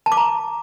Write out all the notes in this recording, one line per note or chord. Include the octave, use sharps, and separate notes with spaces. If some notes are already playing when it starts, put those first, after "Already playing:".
A5
D6
A#5